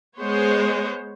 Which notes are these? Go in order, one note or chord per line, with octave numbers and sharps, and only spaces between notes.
G#3 B3 C5 C#5